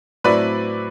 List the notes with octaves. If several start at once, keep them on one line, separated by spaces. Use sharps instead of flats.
A2 F#3 C4 E4 B4 D5